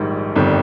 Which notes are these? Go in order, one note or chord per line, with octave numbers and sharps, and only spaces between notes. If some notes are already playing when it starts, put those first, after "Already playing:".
Already playing: A#1 G#2 D#3 G3
G1 F2 D#3 G3